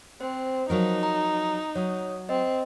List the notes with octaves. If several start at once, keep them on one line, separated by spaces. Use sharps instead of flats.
C4 C5
F3 F#3 D#4 A#4
A#5
F#3 C#5 D#6
C4 D#5